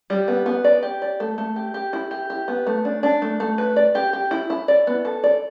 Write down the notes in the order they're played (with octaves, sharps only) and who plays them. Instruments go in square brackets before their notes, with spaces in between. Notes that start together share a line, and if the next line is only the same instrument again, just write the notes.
[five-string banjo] G3
B3
B3
D5
G4
D5
A3
A3
G4
G4
E4
G4
G4
B3
A3
D4
D4
A3
A3
B4
D5
G4
G4
E4
E4
D5
B3
A4
D5